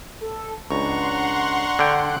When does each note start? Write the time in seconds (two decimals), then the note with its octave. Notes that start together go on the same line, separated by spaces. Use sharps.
0.21 A4
0.71 C#2 D4 F#5 A#5 C6 C#6
1.79 D3 G5 F#6 D7